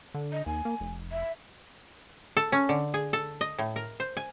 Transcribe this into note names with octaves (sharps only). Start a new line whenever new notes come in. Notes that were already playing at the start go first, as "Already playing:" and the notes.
D3
D#5
D#2 G#5
A#3
F1
E5
A4
C#4
D3
G#4
A4
D#5
A2
A#4
C5
G#5